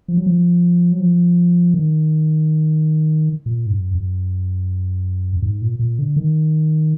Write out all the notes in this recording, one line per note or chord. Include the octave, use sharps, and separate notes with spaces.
F3
F#3
F3
F#3
F3
D#3
A#2
G#2
F#2
F#2
F#2
G#2
A#2
A#2
D3
D#3